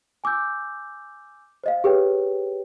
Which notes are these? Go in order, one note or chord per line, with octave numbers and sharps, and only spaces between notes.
G#5 D6 E6 G6
C5 D#5 F5
G4 G#4 B4 C#5 G5